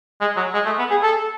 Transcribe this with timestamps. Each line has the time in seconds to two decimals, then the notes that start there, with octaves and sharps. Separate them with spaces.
0.21 G#3
0.37 F#3
0.54 G#3
0.65 A3
0.78 B3
0.90 G#4
1.03 A4